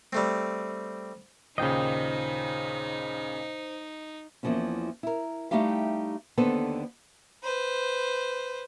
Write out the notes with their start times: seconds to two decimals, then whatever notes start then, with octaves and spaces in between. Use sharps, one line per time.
0.13 G3 A3 C4
1.58 D#2 A#2 C#3 D#4 C5 D#5 G5
4.43 E2 E3 F3 A#3 C#4
5.03 E4 A#4
5.51 G3 A3 D#4 E4 G4 F5
6.37 D#2 D3 B3 A4 B4 C5
7.43 B4 C5